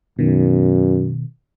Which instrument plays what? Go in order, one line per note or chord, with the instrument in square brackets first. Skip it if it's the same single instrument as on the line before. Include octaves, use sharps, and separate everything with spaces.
[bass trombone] F#2 [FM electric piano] B2 D#3